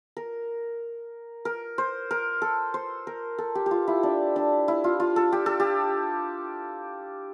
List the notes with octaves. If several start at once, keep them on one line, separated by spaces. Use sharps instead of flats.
A#4
A#4
C5
A#4
A4
C5
A#4
A4
G4
G4
F4
E4
D4
D4
E4
F4
F4
A4
G4
A4
G4